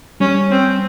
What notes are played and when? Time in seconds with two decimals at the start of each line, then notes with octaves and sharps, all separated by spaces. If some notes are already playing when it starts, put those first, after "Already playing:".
0.20 G3 C#4
0.51 C4